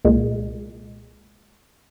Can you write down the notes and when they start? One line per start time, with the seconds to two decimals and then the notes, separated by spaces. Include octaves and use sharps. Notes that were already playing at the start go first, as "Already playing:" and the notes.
0.05 C2 A#2 G#3